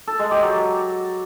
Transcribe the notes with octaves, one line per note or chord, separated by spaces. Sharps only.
A4
G#3
G4
F#3